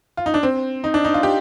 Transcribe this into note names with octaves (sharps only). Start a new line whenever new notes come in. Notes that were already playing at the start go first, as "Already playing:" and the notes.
F4
D#4
D4
C4
D#4
D4
D#4
F4
G4